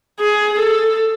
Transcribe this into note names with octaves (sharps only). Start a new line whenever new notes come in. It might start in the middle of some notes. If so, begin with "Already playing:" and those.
G#4
A4